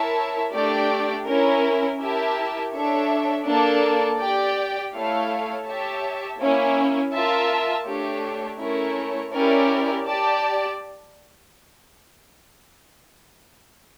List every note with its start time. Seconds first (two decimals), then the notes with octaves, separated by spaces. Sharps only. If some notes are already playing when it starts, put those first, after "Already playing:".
Already playing: E4 A#4 C#5 E5 A5
0.54 A3 D4 G4 D5 G5
1.27 C#4 E4 A#4
2.01 E4 G4 A#4 E5 A5
2.73 D4 A4 C#5 E5
3.47 A#3 D4 A4 D5 A5
4.19 G4 D5 G5
4.94 A3 E4 A4 C#5 F5
5.66 G4 C#5 E5 A5
6.40 A#3 C#4 E4
7.13 F4 A#4 E5 A5
7.86 A3 D4 G4 C#5
8.59 A3 C#4 E4 A#4 C#5
9.33 C#4 E4 G4 A#4 D5
10.06 G4 D5 A5